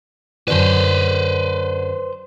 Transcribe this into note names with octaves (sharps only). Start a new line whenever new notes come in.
F#2 D3 B4 C5 D5